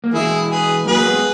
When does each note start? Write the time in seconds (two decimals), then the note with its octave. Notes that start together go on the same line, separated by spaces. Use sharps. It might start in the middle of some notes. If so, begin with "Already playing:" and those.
0.04 A#3
0.13 E3 G#3 E4 G#4
0.50 G#4 B4
0.87 F#3 A#3 G#4 B4
1.05 G#3 B3